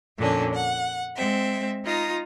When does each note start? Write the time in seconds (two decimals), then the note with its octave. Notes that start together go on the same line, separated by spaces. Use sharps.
0.17 F2 A#2 D3 C#4 D4
0.54 F#5
1.15 G#3 C4 E5
1.84 D#4 F4 A#5 D#6